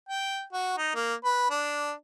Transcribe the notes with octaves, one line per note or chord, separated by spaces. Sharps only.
G5
F#4
D#4
A#3
B4
D4